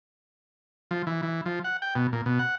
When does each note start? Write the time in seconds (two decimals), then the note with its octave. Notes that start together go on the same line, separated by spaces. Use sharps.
0.91 F3
1.07 E3
1.23 E3
1.46 F3
1.64 F#5
1.82 G5
1.95 B2
2.13 A#2
2.26 B2
2.39 F#5